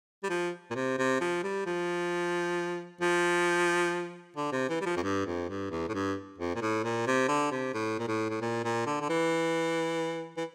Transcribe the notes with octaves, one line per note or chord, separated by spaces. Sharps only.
G3
F3
A#2
C3
C3
F3
G3
F3
F3
D3
C3
E3
G3
F3
F2
G2
F2
G2
E2
A2
G2
F2
A#2
A2
A#2
C3
D3
C3
A2
A#2
A2
A2
A#2
A#2
D3
D3
E3
E3